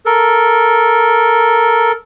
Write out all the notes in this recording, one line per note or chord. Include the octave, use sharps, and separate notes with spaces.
A4 A#4